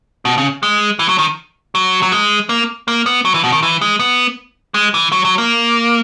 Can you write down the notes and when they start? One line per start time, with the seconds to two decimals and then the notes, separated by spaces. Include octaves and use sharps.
0.25 B2
0.38 C#3
0.63 G#3
0.99 E3
1.09 F#3
1.18 D#3
1.75 F#3
2.02 F#3
2.12 G#3
2.49 A#3
2.88 A#3
3.06 B3
3.25 F#3
3.34 E3
3.44 B2
3.52 D#3
3.63 E3
3.81 G#3
3.99 B3
4.74 G#3
4.94 E3
5.12 F#3
5.25 F#3
5.38 A#3